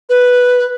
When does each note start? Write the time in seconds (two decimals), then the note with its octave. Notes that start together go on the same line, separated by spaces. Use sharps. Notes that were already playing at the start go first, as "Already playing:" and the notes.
0.09 B4